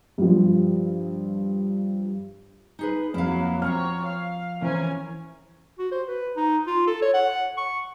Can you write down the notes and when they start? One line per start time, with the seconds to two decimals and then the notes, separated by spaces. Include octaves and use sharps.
0.18 G2 F3
2.79 D#4 G#4 B4
3.14 F2 F#3 A#3 E4 F5
3.62 F3 C4 C#5 F#5 A#5 F6
4.02 F5
4.62 E3 C#4 A#4 C5 G#5
5.78 F#4
5.91 C5
6.08 B4
6.36 D#4
6.67 F4
6.87 A4
7.02 C#5
7.14 F#5
7.57 C#6